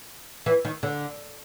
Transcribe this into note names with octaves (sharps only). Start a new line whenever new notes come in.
E3
D#3
D3